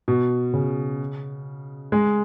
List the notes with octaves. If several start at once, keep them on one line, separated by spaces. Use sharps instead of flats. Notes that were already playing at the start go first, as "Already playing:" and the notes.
B2
C#3
G#3